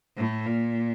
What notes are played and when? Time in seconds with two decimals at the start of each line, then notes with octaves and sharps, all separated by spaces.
0.17 A2
0.46 A#2